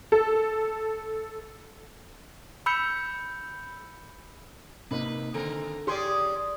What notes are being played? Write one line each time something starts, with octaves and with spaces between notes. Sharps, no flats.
A4
B5 E6 G6 C#7
C3 A#3 D#4 B4
D3 D#3 C4 A#4
C#4 G4 G#4 D5 C6